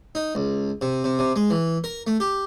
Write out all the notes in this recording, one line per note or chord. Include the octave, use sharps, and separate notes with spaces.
D#4
C#2
C3
C3
C3
G#3
E3
A#4
A3
G4